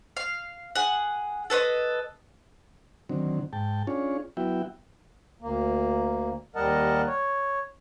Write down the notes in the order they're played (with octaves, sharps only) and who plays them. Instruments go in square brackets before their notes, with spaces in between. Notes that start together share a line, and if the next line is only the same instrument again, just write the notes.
[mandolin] F5
G#4 F#5
A4 B4 C5 D#5
[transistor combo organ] D3 D#3 F#3 C4
G#2 G5 A5
C#4 D4 F4 G#4 C#5
F#3 B3 E4 F#4 E5 G5
[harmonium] D2 A#3
D#2 G3 A#4 D#5 F#5 A5
C#5